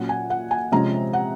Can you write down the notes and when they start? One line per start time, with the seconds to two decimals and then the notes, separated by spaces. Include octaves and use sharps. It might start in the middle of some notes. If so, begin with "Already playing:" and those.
Already playing: A#2 F#3 C#4 F#5
0.09 G#5
0.30 F#5
0.51 G#5
0.72 C3 F3 G#3 C#4 A#5
1.13 F#5